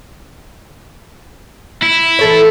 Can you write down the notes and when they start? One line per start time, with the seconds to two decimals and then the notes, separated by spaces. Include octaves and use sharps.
1.83 E4
2.19 E3 A4 C#5